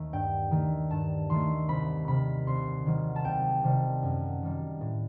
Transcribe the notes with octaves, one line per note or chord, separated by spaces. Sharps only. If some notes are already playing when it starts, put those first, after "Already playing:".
Already playing: D#2 D#3 A3
G2 G5
D#3 A3
G2 A5
D#3 A3 C6
C2 B5
C3 D#3 B5
C2 C6
C3 D#3 F#3
A5
C2 G5
C3 D#3 G3
F#2
D#3 G3
A2